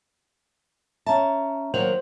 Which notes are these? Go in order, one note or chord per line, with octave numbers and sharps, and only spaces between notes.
C#4 E5 A5 A#5
D#3 F#3 A#3 C5 F#5 F7 F#7